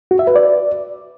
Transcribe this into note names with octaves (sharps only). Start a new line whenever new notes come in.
F#4
E5
B4
D5